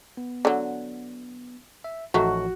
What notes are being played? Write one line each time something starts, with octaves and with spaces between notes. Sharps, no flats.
B3
D3 F#3
E5
A1 D#3 F3 F#3 A3 F#4